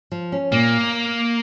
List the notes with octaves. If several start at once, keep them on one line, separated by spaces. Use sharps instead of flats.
F3
C#4
A#2 A#3